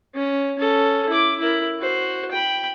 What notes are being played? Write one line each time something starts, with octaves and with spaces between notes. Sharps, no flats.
C#4
C#4 A4
E4 D6
E4 A#4
F#4 C5
G5 B5